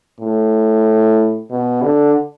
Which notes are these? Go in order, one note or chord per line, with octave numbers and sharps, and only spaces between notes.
A2
B2
D3